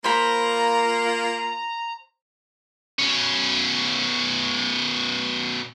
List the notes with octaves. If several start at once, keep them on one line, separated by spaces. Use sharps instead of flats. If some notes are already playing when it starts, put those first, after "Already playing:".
A#3 F4 C5 A#5 B5
B2 C#4